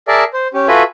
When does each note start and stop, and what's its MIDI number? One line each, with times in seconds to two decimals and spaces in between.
0.08 0.24 68
0.08 0.24 70
0.08 0.24 74
0.08 0.24 76
0.08 0.24 81
0.33 0.48 72
0.54 0.68 61
0.54 0.68 67
0.68 0.83 65
0.68 0.83 66
0.68 0.83 69
0.68 0.83 71
0.68 0.83 76
0.68 0.83 80